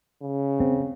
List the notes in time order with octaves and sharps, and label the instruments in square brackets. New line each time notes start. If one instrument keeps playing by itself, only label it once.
[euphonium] C#3
[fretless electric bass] C4